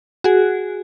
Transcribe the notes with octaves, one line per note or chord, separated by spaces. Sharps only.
F#4 G#4